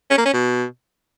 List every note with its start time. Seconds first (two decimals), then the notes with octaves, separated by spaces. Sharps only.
0.10 C#4
0.18 A#3
0.26 C#4
0.33 B2